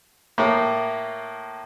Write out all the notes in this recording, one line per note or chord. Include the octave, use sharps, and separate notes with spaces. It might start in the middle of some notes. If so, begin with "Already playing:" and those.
A2 A#3